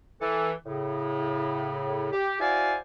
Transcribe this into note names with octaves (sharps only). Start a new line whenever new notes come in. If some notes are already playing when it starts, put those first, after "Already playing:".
E3 A4
A2 C#3
G4
E4 F#4 C5 D5 F5 G#5